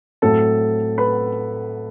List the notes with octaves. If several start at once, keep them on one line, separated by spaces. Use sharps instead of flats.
A2 F#3 C4 A4 A5
B4 B5